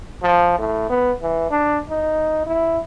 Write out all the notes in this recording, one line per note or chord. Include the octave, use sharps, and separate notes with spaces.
F3
A2
B3
E3
D4
D#4
E4